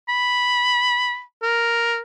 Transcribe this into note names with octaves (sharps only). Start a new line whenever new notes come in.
B5
A#4